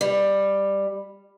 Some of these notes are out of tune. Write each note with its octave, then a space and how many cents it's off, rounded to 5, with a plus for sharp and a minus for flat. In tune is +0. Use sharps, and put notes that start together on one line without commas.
G3 +10